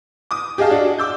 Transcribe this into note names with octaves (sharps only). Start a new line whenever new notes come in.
D6 D#6
G4 G#4 D#5 F5 A5
D4 F#4 D5 D#5
D6 E6 G6